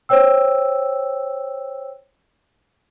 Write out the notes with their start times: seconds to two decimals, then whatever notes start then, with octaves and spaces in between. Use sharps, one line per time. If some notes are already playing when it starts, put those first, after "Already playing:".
0.09 C5 C#5 G5 E6